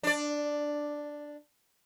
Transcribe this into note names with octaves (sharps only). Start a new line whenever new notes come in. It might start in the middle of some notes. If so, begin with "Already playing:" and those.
D4 D5